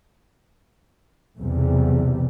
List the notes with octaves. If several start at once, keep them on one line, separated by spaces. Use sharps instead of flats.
B1 E2 C3 G3